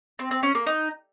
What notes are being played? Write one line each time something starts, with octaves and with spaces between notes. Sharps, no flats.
C4
C4
C#4
A#3
D#4